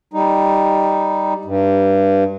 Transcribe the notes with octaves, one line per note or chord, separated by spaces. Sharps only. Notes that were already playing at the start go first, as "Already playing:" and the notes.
G3 D#4
G2